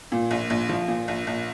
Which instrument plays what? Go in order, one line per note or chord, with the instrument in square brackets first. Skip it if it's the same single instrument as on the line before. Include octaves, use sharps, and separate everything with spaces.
[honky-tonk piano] A#2
A#1
A#1
F3
A#2
A#1
A#1